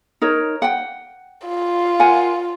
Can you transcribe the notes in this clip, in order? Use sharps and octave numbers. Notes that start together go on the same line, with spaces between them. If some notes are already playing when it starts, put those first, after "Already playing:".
D#4 A#4 C#5
F#5 G5
F4
A#4 F#5 G#5